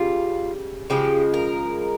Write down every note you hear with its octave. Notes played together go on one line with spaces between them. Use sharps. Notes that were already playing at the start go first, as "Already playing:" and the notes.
Already playing: C#3 G3 F4
C#3 F3 G#3 G4
A#4